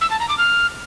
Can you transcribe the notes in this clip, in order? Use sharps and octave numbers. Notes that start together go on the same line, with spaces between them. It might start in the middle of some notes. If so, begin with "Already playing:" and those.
E6
A5
A#5
D6
F6